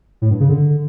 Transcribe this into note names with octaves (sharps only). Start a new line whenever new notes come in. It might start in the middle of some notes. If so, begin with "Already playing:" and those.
A2
G2
C#3
D3